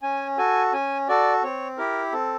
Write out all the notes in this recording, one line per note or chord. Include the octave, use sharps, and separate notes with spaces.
C#4 G#5
F#4 A4 G#5
C#4 G#5
F#4 A4 D5
C4 C#5
E4 G4 A#4
C4 A4